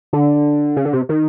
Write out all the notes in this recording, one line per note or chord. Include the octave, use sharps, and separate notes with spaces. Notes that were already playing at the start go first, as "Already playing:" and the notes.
D3
C#3
D3
C3
D#3